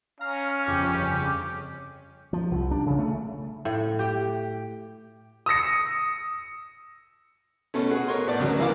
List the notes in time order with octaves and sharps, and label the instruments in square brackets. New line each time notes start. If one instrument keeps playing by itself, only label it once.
[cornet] C#4 [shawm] F5 [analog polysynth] A#5
[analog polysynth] G1 F2 C#3 [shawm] G4
[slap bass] F3
C2
D4
C#3
A3
[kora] A2
G4
[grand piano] D#6 E6 A#6 C#7
[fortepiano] B2 A3 C#4
F#4 G#4 B4
A#4 B4 C#5 D#5 C6
A2 B3 D5
D2 C#3 F#3 A#4
E3 A#3 E4 F5 D6